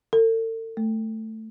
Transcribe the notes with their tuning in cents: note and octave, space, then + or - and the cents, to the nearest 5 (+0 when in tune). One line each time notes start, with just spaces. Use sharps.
A4 +45
A3 +0